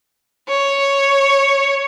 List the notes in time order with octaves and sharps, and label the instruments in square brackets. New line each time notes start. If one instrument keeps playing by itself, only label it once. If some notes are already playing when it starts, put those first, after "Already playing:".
[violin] C#5